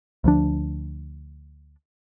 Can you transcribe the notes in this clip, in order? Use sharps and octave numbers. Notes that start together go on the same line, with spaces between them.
D2 F3 D4